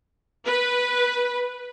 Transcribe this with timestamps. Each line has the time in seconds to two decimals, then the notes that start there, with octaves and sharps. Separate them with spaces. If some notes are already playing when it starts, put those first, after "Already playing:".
0.46 B4